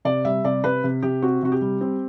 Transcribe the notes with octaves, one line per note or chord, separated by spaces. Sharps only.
C3 D5
G3 E5
C3 D5
C3 B4
C3
C3 G4
C4 F#4
C3 F#4
G4
G3
C4